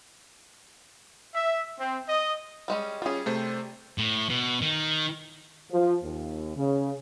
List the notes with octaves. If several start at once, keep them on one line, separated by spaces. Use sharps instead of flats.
E5
C4
D#5
G3 G#3 C#4
G3 C#4 F4 G#4
C3 A3 C5
A2
B2
D#3
F3
D#2
C#3